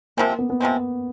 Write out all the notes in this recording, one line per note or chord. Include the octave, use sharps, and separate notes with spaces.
C3 F3 G#3 A#3 C4
B3
B3
C3 F3 G#3 C4